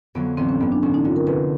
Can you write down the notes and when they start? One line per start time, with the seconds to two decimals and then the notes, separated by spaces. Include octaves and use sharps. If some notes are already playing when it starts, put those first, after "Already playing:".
0.15 F2 D3 F#3 B3
0.37 A1 C4
0.49 C#4
0.60 G2 D3 B3
0.72 D4
0.82 A1 C#4
0.94 D#4
1.04 G2 D3 F4
1.16 A#4
1.27 F1 B4